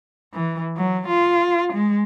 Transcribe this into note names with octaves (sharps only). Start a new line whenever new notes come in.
E3
F#3
F4
G#3